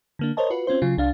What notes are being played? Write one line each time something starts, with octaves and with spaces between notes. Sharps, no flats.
D3 A#3 D4
A#4 C5 C#5 D#5 A5
F4 F#4 B4
C4 C#4 F4 C5
C#3 F#3 F4
C2 D4 F5 A6